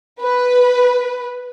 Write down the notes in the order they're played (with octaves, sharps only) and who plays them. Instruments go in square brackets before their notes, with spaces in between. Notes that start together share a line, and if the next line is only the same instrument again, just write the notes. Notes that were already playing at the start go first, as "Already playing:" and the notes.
[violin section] B4